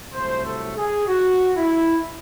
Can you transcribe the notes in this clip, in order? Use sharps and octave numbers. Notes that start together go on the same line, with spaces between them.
C2 C3 F#3 A3 C5
A4
G#4
F#4
E4